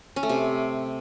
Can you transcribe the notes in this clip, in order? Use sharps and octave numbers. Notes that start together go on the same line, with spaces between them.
C#4
A3
C3